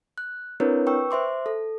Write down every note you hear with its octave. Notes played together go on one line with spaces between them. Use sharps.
F#6
C4 D4 E4 A#4 B4 C#5
B4 G5 C#6 E6
C5 E5 C6 D6
A4